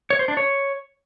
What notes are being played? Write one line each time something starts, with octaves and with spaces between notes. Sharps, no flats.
C#5
C5
D4
C#5